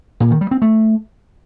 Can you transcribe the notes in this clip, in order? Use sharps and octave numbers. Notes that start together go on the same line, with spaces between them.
A#2
D#3
G3
C4
A3